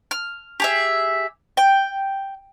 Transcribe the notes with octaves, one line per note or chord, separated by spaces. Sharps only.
F6
G4 G#4 E5
G5